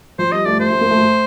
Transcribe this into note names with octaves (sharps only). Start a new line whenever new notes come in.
F3 C5
G3 D#5
A3 D5
A3 C5
A3
A#3
A3